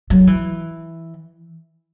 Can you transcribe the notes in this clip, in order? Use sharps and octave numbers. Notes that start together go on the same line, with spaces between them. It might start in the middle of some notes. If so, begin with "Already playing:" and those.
F#3
E3